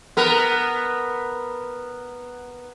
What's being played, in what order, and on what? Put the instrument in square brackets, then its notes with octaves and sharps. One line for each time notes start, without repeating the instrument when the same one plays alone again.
[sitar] B3 A#4